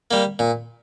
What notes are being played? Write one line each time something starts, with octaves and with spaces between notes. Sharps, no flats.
G3 A#3
A#2